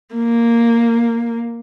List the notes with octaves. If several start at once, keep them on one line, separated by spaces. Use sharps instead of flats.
A#3